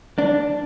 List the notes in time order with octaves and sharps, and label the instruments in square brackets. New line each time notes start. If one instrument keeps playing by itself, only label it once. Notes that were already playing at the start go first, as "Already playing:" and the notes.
[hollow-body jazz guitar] D4